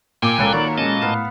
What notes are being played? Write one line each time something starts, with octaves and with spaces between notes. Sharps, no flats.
A#2 G5 G#5 D6
C#2 A#3 A4 B4 C#5
D#3 F#3 D5
G#3 C#4 D#5 A5
A2 B3 F5